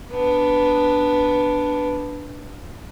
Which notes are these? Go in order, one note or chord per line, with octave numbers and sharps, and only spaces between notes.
B3 D4